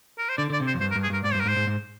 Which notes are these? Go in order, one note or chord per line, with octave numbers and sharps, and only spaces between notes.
A#4
C5
D3 D5
D3 D5
C3
C5
F2
G2 C5
A#4
G2
G#4
G2 A#4
G#2 D5
G2 C5
A#4
G#2 C5
G#2
G#2